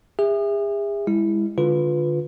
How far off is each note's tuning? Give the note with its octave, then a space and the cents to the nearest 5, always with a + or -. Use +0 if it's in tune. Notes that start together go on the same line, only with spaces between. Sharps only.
G#4 -40 E5 +0
G#3 -30 E4 +0
D3 +0 F4 +15 B4 +5